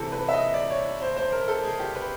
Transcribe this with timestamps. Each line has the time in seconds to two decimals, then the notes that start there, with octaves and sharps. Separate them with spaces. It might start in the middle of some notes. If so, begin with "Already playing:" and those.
Already playing: C3 E3 A4
0.12 B4
0.29 E5
0.33 D#5
0.54 D5
0.70 C#5
1.01 C5
1.16 C5
1.32 A#4
1.48 A4
1.64 G#4
1.79 G4
1.95 B4